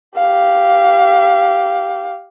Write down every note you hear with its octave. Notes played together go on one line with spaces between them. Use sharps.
G4 F5